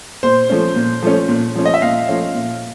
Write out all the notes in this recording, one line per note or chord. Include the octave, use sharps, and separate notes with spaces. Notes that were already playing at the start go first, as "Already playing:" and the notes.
A#2 C5
F3 A3 C#4
A#2
F3 A3 C#4
A#2
F3 A3 C#4
D#5
E5
A#2 F5
F3 A3 C#4
A#2